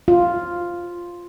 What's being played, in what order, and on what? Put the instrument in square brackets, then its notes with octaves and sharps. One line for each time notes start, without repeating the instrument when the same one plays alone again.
[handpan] F4